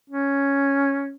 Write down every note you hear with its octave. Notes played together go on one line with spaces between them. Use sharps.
C#4